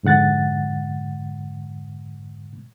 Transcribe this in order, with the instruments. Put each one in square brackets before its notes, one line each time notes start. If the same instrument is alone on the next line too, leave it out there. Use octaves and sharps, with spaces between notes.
[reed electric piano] F2 G#2 D3 F#5 A6